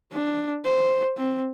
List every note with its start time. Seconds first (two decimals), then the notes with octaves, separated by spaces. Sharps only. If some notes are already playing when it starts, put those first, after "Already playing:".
0.12 D4
0.65 C5
1.17 C4